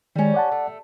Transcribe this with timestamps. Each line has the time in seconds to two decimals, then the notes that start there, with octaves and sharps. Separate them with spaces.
0.16 D#3 G3 G#3 C#4
0.34 D5 F#5 A5
0.52 A3